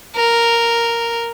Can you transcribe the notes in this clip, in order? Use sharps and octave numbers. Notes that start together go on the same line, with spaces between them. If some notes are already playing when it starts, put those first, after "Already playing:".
A#4